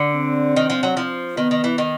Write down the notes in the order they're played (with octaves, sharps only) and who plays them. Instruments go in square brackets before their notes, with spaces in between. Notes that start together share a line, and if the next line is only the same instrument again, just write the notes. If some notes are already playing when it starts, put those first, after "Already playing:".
Already playing: [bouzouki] D3
[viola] C4
[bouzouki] D#3
F3
F#3
F3
[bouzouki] D#3 [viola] B3
[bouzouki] D#3
E3
D#3